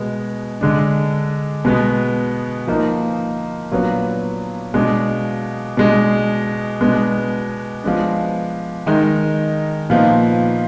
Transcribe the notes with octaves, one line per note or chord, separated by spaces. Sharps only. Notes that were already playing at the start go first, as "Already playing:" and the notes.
Already playing: B2 G#3 B3
D3 G#3 D4
B2 G#3 B3
F3 A#3 D#4
A#2 F#3 B3 D4
B2 G#3 D4
B2 G#3 D4
B2 G#3 B3 D4
F3 G#3 B3 D4
D#3 G#3 D#4
A#2 F3 B3 D#4